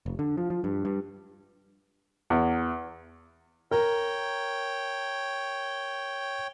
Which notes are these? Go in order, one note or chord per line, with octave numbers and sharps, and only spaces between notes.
F1
D3
F3
F3
G2
G2
E2
A#4 C#5 G5